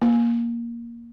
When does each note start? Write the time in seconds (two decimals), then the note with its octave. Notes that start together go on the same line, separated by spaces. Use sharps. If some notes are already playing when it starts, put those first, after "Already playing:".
0.02 A#3